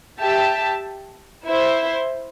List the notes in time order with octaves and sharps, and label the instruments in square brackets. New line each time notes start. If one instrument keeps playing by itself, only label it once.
[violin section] G4 E5 A5
E4 C5 E5